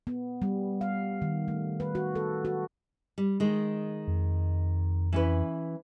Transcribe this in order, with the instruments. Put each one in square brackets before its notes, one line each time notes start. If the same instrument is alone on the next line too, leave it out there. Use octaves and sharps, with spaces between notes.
[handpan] B3
G3
F5
D#3
A3
B4
F#4
A4
F#4
[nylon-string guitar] G3
D#3 G#3
[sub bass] F2
[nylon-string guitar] E3 C#4 B4